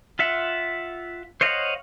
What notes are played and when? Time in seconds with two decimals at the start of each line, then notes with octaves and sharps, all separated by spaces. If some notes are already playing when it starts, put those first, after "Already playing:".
0.19 F4 E5 F#5
1.41 C5 C#5 D#5 F5 F#5